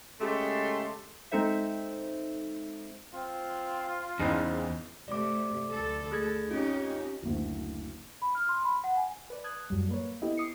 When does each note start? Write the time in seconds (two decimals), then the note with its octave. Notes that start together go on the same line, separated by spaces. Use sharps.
0.21 C#3 G#3 A3 G4 A4 C6
1.32 G#3 C4 D#4 A4 C5 E5
3.14 C4 F4
4.19 E2 G#2 C#3 E3 C4
5.08 C3 A3 D5 D6
5.71 D2 A4
6.11 A3 G#4 G#6
6.51 C4 C#4 D#4 F4 G4
7.23 F#1 D2
8.22 B5
8.35 F6
8.49 C6
8.65 B5
8.84 F#5
8.96 G#5
9.30 B4 D5
9.44 A5 D#6 F#6 G#6
9.70 F#2 A2 F#3 G3
9.89 A#3 B4 C#5
10.22 B3 C4 E4 G4 A4 D#5
10.37 D6 D#6 C7 C#7